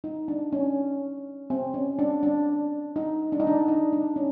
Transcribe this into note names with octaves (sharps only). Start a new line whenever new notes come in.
D#4
D4
C#4
C4
C#4
D4
D4
D#4
D4
D#4
D4
D#4
D4
C#4